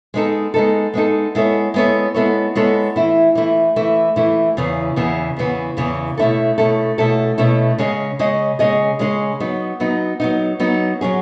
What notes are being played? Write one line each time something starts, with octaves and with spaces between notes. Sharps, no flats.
G#3 B3 D#4 A4
G#3 B3 D#4 A4
G#3 B3 D#4 A4
G#3 B3 E4 A4 C#5
G#3 B3 E4 A4 C#5
G#3 B3 E4 A4 C#5
G#3 B3 E4 A4 C#5
E3 A3 E4
E3 A3 E4
E3 A3 E4
E3 A3 E4
E2 C#3 E3 B3
E2 C#3 E3 B3
E2 C#3 E3 B3
E2 C#3 E3 B3
B2 A3 C#4 E4 A4
B2 A3 C#4 E4 A4
B2 A3 C#4 E4 A4
B2 A3 C#4 E4 A4
C#3 G#3 C#4 G#4 D#5
C#3 G#3 C#4 G#4 D#5
C#3 G#3 C#4 G#4 D#5
C#3 G#3 C#4 G#4 D#5
F#3 B3 D#4
F#3 B3 D#4
F#3 B3 D#4
F#3 B3 D#4
F#3 C#4 G#4